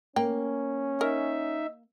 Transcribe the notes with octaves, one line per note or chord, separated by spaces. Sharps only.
A#3 C#4 G5
D#4 A#4 E5